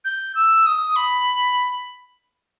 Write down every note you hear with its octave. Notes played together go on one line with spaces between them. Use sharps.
G6
E6
D#6
B5